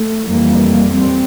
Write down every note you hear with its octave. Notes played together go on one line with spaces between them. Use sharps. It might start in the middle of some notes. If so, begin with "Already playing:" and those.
Already playing: A3
F2 E3 G3 A#3
G3 C4